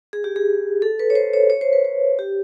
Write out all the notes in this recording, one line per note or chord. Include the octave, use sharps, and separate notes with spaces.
G#4
G4
G#4
A4
B4
C#5
C5
C#5
C#5
C5
B4
C5
G4